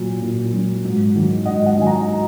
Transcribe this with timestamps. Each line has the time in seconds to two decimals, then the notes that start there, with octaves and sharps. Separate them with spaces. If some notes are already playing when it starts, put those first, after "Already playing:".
Already playing: A#2 F#3
0.22 A#2
0.54 F#3
0.84 G#2
1.15 D#3 F#3
1.45 G#2 D#5 F#5
1.66 D#5 F#5
1.76 D#3 F#3 G#5
1.86 F#5 A#5